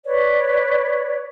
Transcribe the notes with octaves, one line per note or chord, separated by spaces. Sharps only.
B4 C#5 D5